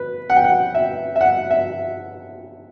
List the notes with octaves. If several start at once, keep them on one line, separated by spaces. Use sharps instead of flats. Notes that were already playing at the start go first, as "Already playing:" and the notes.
Already playing: B4
F#5
G5
F#5
E5
E5
F#5
E5